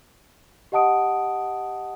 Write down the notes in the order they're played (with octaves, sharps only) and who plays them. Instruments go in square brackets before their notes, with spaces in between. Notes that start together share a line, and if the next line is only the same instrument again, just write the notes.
[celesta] G4 D#5 F#5 A5 D#6 D7